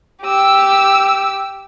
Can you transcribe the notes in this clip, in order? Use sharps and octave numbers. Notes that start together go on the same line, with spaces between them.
G4 E6